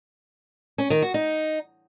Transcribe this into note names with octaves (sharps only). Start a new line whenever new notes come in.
C#4
D#3
F#4
D#4